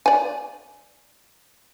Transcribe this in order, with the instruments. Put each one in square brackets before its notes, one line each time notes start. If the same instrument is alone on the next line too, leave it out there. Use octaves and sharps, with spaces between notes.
[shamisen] D5 G#5